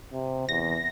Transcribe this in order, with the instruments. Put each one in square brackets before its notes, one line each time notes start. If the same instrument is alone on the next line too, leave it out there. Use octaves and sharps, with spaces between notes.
[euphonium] C3
[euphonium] E2 [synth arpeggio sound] A#6